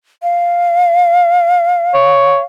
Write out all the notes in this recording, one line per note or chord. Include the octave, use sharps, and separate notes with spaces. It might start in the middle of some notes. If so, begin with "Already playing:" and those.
F5
C#5